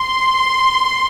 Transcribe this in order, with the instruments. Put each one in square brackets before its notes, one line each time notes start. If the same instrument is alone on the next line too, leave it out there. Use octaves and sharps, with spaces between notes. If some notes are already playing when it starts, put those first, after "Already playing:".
Already playing: [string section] C6